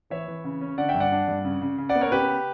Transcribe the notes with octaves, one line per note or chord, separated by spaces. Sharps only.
E3 C#5 E5
E3
C#3
C#4
D3 D5 F#5
E5 G5
G2
D5 F#5
D4
G2
C#3
C#3
C#3
D5 F#5
B3
A#4 C#5
C#3 G4 B4